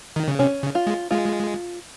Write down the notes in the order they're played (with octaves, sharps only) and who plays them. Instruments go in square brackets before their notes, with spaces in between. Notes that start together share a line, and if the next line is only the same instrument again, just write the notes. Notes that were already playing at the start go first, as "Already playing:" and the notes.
[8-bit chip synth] D#3
C#3
[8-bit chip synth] C3 [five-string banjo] C#4
[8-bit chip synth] C#3
[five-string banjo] F4
[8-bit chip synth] G#3
[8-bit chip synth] G#3 [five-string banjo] F4